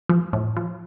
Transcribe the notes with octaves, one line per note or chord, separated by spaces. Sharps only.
F3
A2
F3